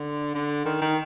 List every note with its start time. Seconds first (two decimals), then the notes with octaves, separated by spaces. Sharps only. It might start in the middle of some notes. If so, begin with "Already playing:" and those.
Already playing: D3
0.34 D3
0.65 D#3
0.82 D#3